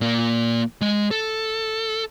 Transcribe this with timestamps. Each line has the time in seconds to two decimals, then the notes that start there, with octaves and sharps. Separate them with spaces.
0.01 A#2 A#3
0.81 G#3 D#5
1.11 A4